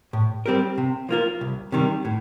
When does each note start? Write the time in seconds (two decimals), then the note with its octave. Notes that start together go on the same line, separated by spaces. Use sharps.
0.13 A2
0.46 G3 C4 G4 A#4
0.78 C3
1.09 F3 A#3 F4 A#4
1.41 C2
1.72 C3 D#3 G3
2.05 A2